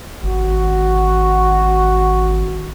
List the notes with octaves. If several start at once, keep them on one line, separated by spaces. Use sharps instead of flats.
G#1 F#4